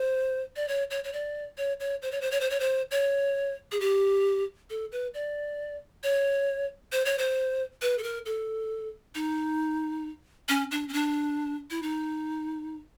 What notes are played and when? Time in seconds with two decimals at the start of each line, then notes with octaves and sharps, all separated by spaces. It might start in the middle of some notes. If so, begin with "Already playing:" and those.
Already playing: C5
0.56 D5
0.68 C#5
0.91 C#5
1.04 C#5
1.13 D5
1.58 C#5
1.80 C#5
2.02 C5
2.11 C#5
2.21 C5
2.31 C#5
2.40 C5
2.50 C#5
2.60 C5
2.91 C#5
3.72 G#4
3.80 G4
4.70 A4
4.92 B4
5.14 D5
6.03 C#5
6.92 C5
7.05 C#5
7.18 C5
7.82 B4
7.98 A4
8.03 A#4
8.26 A4
9.15 D#4
10.49 C#4
10.71 D4
10.88 C#4
10.93 D4
11.70 E4
11.82 D#4